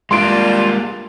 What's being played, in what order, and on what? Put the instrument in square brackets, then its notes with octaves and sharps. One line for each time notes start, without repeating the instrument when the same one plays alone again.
[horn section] G3 D4 [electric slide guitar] G#3 A#3 [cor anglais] F4 [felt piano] C6 D7